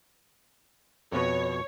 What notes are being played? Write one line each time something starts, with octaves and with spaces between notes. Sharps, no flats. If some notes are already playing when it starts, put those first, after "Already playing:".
F2 B2 B4 C#5